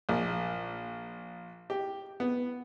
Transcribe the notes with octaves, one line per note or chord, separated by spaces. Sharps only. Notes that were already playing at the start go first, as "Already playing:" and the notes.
A#1
G4
B3